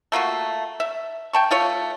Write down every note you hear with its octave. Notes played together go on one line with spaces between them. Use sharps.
A3 A#3 F4 F#4
E5
G5 A5 C#6
A3 F4 C#5